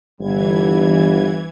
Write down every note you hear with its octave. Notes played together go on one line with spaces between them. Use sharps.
G1 E3 G3 G#6